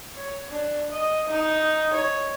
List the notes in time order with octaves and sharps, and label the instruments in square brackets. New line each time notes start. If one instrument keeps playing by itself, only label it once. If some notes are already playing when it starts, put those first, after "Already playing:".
[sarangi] C#5
D4
D#5
D#4
C#5